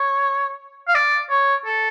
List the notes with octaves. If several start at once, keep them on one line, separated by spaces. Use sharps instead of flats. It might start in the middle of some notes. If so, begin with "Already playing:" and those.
Already playing: C#5
F5
D5
C#5
A4